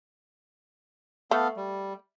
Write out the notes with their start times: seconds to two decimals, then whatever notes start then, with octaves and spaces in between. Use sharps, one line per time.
1.31 A3 B3 A4 F5
1.57 G3